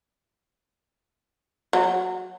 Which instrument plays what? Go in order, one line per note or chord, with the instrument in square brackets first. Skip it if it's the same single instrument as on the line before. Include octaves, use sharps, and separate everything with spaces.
[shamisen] F#3